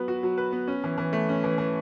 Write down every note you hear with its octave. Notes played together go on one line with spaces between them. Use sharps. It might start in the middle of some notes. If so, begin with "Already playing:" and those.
Already playing: F#3 B3 B4
F#4
F#3
B4
B3
C#4
E3
E3
A3
C#4
E3
E3